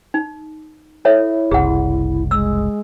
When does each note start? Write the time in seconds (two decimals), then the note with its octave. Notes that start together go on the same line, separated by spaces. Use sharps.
0.14 D#4
1.05 E4 A4 C#5 E5
1.51 F#1 C2 G#4 F#5
2.31 G#3 E6